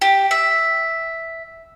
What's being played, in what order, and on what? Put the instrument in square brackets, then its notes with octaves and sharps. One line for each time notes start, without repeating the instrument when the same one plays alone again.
[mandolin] G4
E5